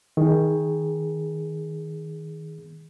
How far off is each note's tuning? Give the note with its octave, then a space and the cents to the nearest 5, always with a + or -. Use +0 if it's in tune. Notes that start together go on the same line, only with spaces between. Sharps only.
D#3 +25 G#4 +0